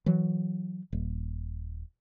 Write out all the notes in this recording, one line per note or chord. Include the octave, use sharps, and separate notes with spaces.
E3 F#3
D#1